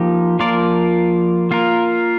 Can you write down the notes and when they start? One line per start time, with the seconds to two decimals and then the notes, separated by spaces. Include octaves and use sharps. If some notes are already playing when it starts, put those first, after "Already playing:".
Already playing: F3 A#3 D#4 G4
0.39 F3 A#3 F4 A#4 D5
1.51 A#3 F4 A#4